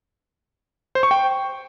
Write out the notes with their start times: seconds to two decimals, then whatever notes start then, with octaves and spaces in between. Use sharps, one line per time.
0.95 C5
1.03 C#6
1.11 G5